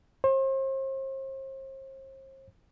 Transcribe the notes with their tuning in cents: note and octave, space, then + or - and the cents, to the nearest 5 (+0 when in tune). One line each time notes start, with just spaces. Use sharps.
C5 +40